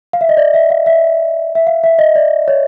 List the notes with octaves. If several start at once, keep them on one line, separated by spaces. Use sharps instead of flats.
F5
E5
D#5
D5
E5
F5
E5
E5
F5
E5
D#5
D5
C#5